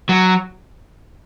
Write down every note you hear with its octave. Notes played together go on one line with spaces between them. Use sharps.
F#3